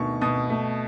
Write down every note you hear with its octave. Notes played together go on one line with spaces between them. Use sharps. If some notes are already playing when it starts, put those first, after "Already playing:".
Already playing: D2 B2 D#3 C#6
B2 D#6
A3